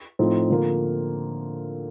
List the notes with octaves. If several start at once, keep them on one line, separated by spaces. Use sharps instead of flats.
A2 F3 C4 D#4
D3 F3 A#3